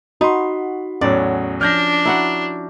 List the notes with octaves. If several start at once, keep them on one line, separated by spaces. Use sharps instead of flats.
D#4 F#4 B5 C6
E2 A2 F#3 C#4 D5
F3 D4 F6 G6 A#6
E4 F#4 F#5 A#5